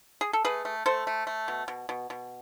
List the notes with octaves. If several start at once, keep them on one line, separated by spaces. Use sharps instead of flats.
G#4
A4
A3 G#4 B4
A3
A3 A4 C5
A3
A3
B2
B2
B2
B2